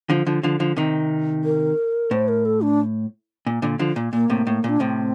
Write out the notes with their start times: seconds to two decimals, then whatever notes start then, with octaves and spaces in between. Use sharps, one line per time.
0.10 D3 F3
0.27 D3 F3
0.43 D3 F3
0.60 D3 F3
0.77 C3 D#3
1.44 A#4
2.11 A2 C5
2.28 A#4
2.45 A4
2.62 D4
3.46 A#2
3.62 A#2 D3
3.79 D3 F3
3.96 A#2
4.13 A#2 A#3
4.30 A2 C3
4.47 A2
4.64 A#2 D4
4.80 A2 C3 C4